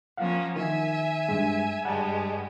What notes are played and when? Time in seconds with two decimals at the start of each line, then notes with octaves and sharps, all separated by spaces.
0.17 F3 A#3 C#4 F5 F#5
0.56 D#3 E5 G#5
1.29 G2 G#3
1.85 G2 G3 G#3 F#5 G#5 A5